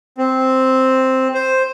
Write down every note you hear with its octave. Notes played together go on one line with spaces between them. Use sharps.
C4
C5